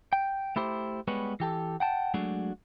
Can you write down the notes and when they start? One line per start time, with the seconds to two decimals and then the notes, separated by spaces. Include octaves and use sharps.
0.13 G5
0.56 A3 E4 G4 C5
1.08 G3 G#3 B3 B4 C#5
1.40 E3 G4 A4
1.80 F#5 G5 A5
2.14 F#3 G#3 A3 D4 F#4